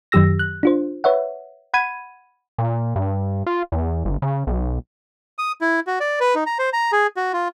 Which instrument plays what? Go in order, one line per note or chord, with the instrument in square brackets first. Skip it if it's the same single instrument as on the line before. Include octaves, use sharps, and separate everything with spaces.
[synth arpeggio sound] F#2 D#3 F#3 G4 E6 A#6
F#6
D4 F4 C5
B4 C#5 E5 F#5
F#5 B5 G#6 D#7
[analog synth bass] A#2
G2
F4
E2
G1
C#3
B1
[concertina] D#6
E4
F#4
D5
B4
D#4
A#5
C5
A#5
G#4
F#4
F4